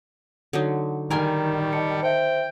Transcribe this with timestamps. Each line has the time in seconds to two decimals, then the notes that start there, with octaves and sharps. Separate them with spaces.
0.53 D3 F#3 D#4
1.10 D#3 G3 A#4 G#5 A#5 C6
1.73 D#5 A5 C#7
2.03 C5 E5 G5